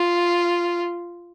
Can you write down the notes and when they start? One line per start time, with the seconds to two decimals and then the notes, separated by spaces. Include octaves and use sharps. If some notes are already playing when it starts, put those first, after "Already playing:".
Already playing: F4